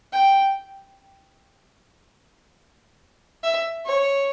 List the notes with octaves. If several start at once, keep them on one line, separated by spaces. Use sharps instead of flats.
G5
E5
C#5